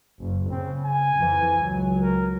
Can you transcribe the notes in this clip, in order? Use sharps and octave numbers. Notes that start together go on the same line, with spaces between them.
F#1
C#3 C4
G#5
F2 E3
C#2 F#3
A#4